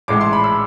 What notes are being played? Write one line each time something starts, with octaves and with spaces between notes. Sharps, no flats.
A1 A2 G#3 D6
C6
B5
E6